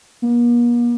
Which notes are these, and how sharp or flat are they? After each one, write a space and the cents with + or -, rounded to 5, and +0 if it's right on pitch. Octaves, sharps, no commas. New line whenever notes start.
A#3 +45